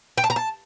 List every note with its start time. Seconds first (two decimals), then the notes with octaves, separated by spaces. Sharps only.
0.18 G5
0.24 A5
0.30 A#5
0.36 A5